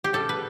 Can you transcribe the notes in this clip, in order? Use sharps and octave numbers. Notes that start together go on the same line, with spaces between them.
G4
C#3 G3 A4
B4